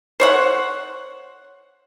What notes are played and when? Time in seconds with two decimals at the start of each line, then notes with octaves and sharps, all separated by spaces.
0.20 C5 C#5 F#5